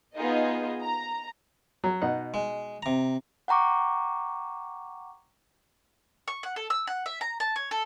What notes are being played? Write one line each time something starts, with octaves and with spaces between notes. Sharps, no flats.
B3 D#4 F4 G#4 D#5
A#5
F#3
B2 D#4 F#5
G#3
C3 A#5
F#5 G5 A#5 C#6 D6
C#6
F#5
A4
E6
F#5
E5
A#5
A5
C#5
A4